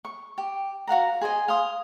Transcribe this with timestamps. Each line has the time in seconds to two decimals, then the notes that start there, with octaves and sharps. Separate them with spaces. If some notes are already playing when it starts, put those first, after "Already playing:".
0.05 C#6
0.38 G4
0.87 F#4 F5 F#5 A#5
1.21 G#4 C5 D#5 G#5
1.48 F5 C6 D#6